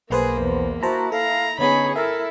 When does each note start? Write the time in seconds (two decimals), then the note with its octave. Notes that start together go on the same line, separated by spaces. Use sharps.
0.10 B1 A#3 G#4 B4 C5
0.41 E2
0.83 E4 F#4 C5 A5 A#5
1.12 A4 F5 A#5
1.59 D3 B3 C#4 D#4 G#4 C#5 B5
1.96 E4 A4 A#4 E5